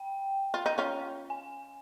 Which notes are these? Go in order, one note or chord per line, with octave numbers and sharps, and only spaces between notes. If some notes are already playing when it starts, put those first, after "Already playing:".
Already playing: G5
F4
D#4
C#4 F4
G#5